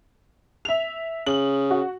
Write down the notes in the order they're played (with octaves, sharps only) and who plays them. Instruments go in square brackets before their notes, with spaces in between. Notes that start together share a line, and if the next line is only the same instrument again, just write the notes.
[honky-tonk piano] E5 F7
[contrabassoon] C#3 [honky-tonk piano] F#7
[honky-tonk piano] F#4